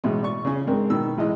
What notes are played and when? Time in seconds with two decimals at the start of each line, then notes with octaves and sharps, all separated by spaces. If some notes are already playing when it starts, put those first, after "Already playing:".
0.04 A1 B2 G#3
0.23 D5 C#6
0.45 C#3 C#4
0.67 G#2 G#3 C4 D4 A#4
0.90 B2 D#3 E6
1.18 A1 E3 G#3 D#5